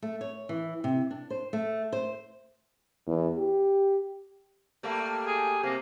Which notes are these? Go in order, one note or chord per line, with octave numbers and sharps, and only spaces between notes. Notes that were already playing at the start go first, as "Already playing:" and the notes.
A3
C#5
E3
C3
D4
C5
A3
C5
E2
G4
G3 A3 A#3
G#4
C3 A#3